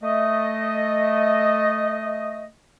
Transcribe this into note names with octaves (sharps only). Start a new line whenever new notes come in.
A3 D#5